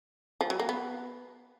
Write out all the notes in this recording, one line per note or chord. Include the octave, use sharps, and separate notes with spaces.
F3
F#3
A#3
B3